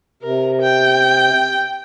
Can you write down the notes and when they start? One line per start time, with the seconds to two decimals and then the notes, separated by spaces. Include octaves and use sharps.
0.23 C3 A#4
0.62 G5